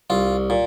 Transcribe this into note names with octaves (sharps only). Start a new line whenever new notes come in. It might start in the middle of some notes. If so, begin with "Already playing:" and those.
C2 F4
A#2